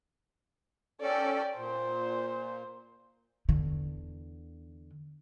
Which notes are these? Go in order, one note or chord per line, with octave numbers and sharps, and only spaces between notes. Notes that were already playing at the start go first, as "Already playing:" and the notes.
C#4 A4 D5 G5
A#2 C5
E2 D3